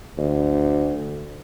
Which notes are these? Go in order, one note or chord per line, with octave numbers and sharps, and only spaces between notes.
D2